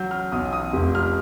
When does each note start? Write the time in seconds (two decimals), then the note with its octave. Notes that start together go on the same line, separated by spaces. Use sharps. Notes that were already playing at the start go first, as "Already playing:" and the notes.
Already playing: F#3 G6
0.11 F6
0.32 B1 D#6
0.53 D#6
0.73 F1
0.95 F6